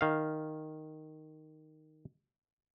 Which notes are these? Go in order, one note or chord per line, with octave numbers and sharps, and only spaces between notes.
D#3 F5